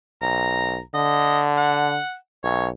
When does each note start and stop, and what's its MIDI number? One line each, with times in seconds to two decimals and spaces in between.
0.22 0.80 35
0.22 0.80 82
0.94 1.99 50
0.94 1.41 75
1.57 2.15 78
2.44 2.69 35
2.44 2.66 73